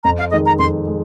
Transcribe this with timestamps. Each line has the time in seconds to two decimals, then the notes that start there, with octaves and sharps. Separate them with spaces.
0.04 F2 A#5
0.19 F5
0.32 D#3 G#3 D#5
0.46 A#5
0.59 F2 C6
0.87 G#3